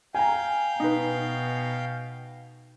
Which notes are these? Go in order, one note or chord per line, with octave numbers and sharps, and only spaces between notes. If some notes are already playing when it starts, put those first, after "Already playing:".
F5 G5 G#5 A#5
B2 D#4 B4